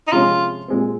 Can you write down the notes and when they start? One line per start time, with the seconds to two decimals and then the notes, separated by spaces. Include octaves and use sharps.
0.08 D#4
0.12 C3 F3 G#3 C#4 F4
0.68 A#2 G#3 C4